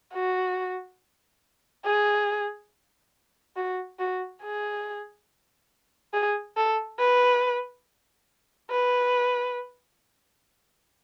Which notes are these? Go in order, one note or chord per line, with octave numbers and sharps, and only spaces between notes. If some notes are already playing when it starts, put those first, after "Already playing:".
F#4
G#4
F#4
F#4
G#4
G#4
A4
B4
B4